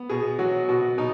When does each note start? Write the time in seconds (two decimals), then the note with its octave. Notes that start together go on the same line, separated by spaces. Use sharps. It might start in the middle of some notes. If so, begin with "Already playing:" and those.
Already playing: B3
0.09 B2 G#4
0.39 F#3 F#4
0.69 B2 F#4
0.98 B2 D#4